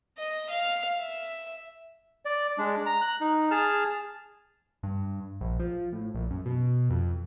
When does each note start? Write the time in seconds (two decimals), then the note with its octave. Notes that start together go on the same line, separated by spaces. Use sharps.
0.18 D#5
0.50 F5
0.99 E5
2.25 D5
2.58 G#3 D4
2.86 A#5
3.02 F#6
3.21 D#4
3.51 G#4 A5 F6
4.83 G2
5.41 A#1
5.60 F3
5.93 A2
6.14 A#1
6.31 F#2
6.46 B2
6.90 F2